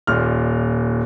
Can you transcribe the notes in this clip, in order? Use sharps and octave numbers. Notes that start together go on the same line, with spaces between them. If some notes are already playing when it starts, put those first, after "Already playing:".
D#1 A#2 F6